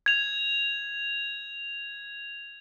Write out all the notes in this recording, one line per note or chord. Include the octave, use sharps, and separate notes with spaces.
G#6 F7